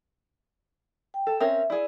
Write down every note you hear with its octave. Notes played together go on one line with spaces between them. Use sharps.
G5
A4
C4 C#4 A#4 E5
E4 G#4 D5